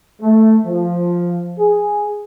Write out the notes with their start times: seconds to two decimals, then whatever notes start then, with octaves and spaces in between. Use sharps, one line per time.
0.21 A3
0.65 F3
1.58 G#4